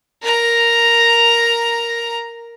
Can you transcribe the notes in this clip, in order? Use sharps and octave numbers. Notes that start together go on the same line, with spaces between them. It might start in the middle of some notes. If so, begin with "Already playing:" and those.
A#4 A#5